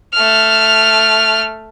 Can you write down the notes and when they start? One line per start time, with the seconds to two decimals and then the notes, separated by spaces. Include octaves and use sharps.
0.14 A3 F6